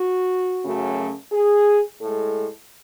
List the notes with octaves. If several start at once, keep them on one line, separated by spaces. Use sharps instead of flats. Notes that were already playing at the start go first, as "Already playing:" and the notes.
Already playing: F#4
F#2 C#3 F#3 A3
G#4
A2 G#3 A4